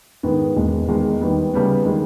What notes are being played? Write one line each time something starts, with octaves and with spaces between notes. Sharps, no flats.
G#2 D#3 G#3 B3
E1 E2 D#3 G#3
E2 D#3 G#3 D#4
D#2 D#3 G3 B3
C#3 G3 B3
D#3 G#3